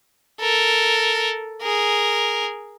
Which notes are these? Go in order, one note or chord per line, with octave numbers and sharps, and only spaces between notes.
A4 A#4
G#4 A#4